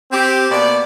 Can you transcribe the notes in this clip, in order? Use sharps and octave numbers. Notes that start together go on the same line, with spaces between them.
C4 G4
B2 A#3 D5